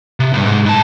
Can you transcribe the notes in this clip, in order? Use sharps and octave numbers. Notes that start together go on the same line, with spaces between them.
C3
C2 G2
G#2
G#2 A5